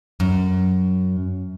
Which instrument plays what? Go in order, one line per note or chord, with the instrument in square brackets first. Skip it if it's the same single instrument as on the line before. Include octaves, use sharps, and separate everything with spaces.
[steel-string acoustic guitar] F#2